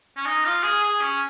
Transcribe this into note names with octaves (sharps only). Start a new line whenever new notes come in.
C#4
D#4
F4
G#4
G#4
C#4